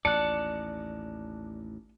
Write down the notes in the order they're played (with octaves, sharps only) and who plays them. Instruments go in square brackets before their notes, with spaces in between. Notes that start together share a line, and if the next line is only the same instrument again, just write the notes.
[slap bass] A1 D#2 [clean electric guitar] D5 [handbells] A5 F#6 [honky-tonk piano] C#7